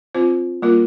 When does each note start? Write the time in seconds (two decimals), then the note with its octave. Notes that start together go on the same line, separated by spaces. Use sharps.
0.15 C4 F4 C5
0.62 G3 A#3 F4 A#4